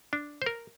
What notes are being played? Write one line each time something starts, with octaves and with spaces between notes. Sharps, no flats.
D4
C5
A#4